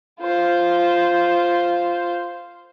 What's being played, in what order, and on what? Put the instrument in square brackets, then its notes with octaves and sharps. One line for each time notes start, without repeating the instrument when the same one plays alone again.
[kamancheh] F4 C5